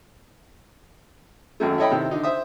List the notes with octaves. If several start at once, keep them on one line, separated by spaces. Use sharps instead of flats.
G#1 F#2 A3
E4 A4 C#5 D#5 G5 B5
C3 D#3 E4
D3 D#4
C5 E5 D#6